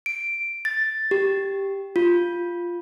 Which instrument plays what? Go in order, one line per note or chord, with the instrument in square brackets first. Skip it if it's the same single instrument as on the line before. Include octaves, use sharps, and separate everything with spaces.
[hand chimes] D7
A6
G4
F4